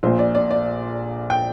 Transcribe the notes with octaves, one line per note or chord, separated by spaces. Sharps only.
A#1 A#2 C5
D5
D5
D5
G5